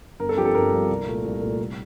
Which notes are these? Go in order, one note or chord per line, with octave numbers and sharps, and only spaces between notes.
G1 A#4
A4
G2 F3 C4 G4
A4
G1 A#4
G2 F3 C4
C2
A#2 A3
C2
A#2 A3
C2